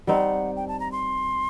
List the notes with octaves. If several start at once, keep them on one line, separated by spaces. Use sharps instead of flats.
G3 C4 D#4 F#5
G5
A5
A#5
C6